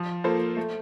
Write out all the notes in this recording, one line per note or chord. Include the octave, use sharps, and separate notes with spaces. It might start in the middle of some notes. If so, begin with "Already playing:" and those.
Already playing: F3
A#3 F4 A4 C5
A3